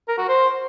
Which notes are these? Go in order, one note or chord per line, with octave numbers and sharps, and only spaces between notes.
A#4
F#4
C5